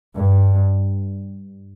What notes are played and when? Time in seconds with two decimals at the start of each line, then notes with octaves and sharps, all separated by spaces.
0.17 G2